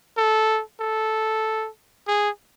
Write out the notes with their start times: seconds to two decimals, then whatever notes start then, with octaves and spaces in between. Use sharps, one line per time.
0.17 A4
0.81 A4
2.08 G#4